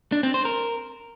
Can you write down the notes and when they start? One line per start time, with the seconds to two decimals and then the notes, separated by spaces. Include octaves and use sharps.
0.12 D4
0.23 C4
0.34 C5
0.45 A#4